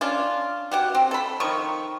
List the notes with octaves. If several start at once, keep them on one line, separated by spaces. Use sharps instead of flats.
C#4 D4 F4
F#4 G4 F#5
C4
A4 B5
D#3 F3 C#6